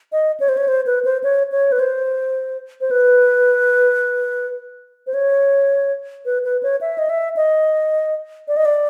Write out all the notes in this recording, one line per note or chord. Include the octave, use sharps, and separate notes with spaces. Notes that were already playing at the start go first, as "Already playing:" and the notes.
D#5
C#5
C5
C#5
C5
B4
C5
C#5
C#5
B4
C5
C5
B4
C5
C#5
B4
B4
C#5
E5
D#5
E5
D#5
D5
D#5
D5